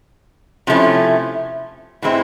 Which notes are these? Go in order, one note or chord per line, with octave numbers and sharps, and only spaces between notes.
C3 F3 A3 C#4 E4
A2 E3 G#3 C4 E4